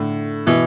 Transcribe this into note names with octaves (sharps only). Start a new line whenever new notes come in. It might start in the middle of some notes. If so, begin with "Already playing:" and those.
Already playing: A2 D3
B2 E3